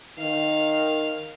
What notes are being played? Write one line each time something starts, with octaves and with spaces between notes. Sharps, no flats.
D#3 F5